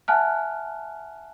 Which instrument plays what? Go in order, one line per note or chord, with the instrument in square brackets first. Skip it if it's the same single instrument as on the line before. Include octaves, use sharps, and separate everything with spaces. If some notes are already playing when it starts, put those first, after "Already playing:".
[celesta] E5 F#5 G#5 A5 F6 F#6